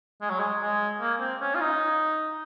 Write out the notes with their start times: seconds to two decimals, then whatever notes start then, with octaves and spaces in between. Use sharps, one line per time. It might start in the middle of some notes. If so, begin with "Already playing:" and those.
0.22 G#3
0.30 F#3
0.40 G#3
0.61 G#3
1.01 A#3
1.20 C4
1.41 C#4
1.55 F4
1.61 D#4